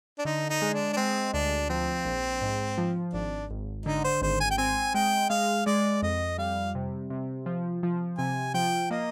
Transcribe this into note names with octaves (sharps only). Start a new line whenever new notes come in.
D4
D3 D#4
D#4
G#3
D4
D4
G#3 C4
D2 D4
F3 C4
A#1
G#2
F3
G#1 D4
G#1
D3 D#4
C5
G#1 C5
G#5
G5
C4 G#5
G#3 G5
G#3 F5
G#3 D5
F2 D#5
G3 F5
C3
C3
F3
F3
C3 G#5
F3 G5
A#3 D#5